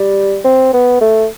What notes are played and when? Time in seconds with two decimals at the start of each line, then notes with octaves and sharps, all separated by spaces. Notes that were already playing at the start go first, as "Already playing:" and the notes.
Already playing: G3
0.44 C4
0.73 B3
1.01 A3